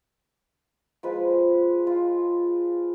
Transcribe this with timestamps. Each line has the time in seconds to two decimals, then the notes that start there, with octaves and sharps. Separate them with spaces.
1.03 F3 G#3 B4
1.87 F4